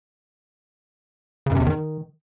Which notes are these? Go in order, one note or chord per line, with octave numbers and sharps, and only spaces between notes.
C#3
F#2
C3
E2
D#3